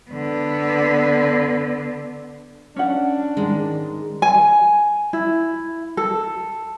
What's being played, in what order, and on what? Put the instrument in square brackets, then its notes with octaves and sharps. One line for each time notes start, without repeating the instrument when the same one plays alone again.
[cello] D3 B3
[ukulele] C#4 F#5 [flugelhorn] D4
[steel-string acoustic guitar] G#2 D#3 [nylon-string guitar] G#3
[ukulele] G#5
E4
A4